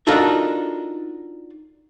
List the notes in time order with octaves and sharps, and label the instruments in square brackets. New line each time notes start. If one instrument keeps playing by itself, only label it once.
[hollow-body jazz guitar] D4 D#4 F4 F#4 A4 A#4